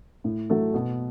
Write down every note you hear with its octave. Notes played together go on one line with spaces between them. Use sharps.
A2
F#3 A3 E4 A4
B2